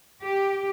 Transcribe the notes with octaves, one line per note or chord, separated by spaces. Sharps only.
G4